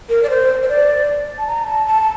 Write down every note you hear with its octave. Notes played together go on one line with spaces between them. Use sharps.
A#4
D5
C5
C5
D5
A5
A#5
A5
A5